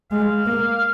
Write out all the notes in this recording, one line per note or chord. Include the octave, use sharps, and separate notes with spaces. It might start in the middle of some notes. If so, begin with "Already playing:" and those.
G#3 F5
A#3